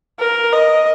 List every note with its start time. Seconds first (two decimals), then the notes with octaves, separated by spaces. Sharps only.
0.19 A#4
0.53 D#5